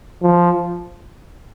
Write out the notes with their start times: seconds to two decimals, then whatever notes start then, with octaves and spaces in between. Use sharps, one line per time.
0.23 F3